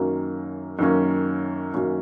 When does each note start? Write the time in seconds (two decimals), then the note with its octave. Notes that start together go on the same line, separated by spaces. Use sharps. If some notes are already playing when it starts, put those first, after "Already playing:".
Already playing: F#2 D#3 F#3 A#3 C#4
0.79 F#2 D#3 F#3 A#3 C#4
1.74 F#2 D#3 F#3 A#3 C#4